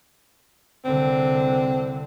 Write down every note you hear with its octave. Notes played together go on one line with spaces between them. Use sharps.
C2 D3 C4